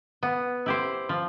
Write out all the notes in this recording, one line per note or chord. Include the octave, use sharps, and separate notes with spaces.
B3
E4 G4 C5
F3